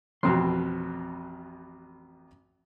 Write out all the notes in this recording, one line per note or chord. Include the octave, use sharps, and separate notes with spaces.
A1 F2 B2 C4 C6